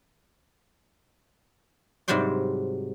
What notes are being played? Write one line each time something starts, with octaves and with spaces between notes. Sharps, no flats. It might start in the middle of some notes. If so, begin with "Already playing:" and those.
G#2 C3 F#3 G3 C5 D5